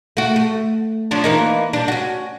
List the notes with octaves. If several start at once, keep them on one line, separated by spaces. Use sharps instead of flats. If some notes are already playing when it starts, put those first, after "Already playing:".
A3 F#4
A3
F3 C#4 D4
E3 A#3 D#4
G3 D4
C#4 F#4